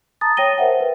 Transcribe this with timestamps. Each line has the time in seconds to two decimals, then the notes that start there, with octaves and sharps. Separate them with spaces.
0.21 A5 A#5 D#6 A6
0.37 C#5 G5 A#6 D#7 G7
0.58 A#4 C5 E5 F#5 G5
0.81 B4